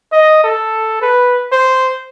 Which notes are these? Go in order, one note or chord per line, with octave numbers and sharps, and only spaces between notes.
D#5
A4
B4
C5